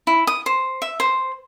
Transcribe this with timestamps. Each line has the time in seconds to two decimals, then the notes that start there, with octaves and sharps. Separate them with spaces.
0.07 E4
0.27 D#6
0.46 C5
0.82 E5
1.00 C5